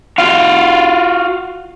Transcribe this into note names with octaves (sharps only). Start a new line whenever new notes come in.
F4 F#4 F5